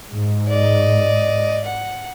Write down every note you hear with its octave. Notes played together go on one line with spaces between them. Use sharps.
G#2
D5 D#5
F#5